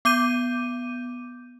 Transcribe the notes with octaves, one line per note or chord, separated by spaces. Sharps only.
B3 D6 G6 D#7